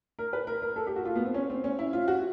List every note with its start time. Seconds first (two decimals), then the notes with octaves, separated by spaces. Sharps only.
0.19 A#4
0.33 B4
0.47 A#4
0.62 A#4
0.76 A4
0.87 G4
0.96 F#4
1.05 F4
1.15 B3
1.25 C4
1.34 C#4
1.50 C4
1.64 C#4
1.79 E4
1.93 F4
2.08 F#4